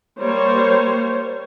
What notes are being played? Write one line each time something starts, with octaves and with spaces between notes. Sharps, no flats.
G3 A#3 C5 C#5